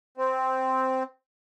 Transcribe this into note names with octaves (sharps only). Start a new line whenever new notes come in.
C4